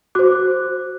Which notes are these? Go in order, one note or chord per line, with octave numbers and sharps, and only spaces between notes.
F#4 C5 D6 F#6